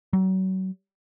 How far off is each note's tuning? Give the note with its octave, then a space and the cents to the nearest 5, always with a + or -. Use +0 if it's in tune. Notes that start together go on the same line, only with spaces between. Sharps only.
F#3 +30